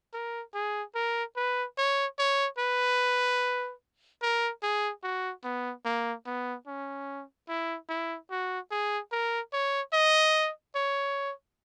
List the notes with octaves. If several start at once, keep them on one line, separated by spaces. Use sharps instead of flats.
A#4
G#4
A#4
B4
C#5
C#5
B4
A#4
G#4
F#4
B3
A#3
B3
C#4
E4
E4
F#4
G#4
A#4
C#5
D#5
C#5